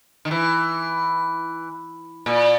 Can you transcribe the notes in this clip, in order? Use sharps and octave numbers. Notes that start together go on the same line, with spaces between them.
D#3
E3
A#2